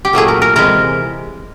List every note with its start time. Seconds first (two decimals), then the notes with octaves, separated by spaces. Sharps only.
0.05 G4
0.13 A#2 F#3 A3 G#4
0.28 A#4
0.42 A#4
0.56 C3 E3 G#3 A#4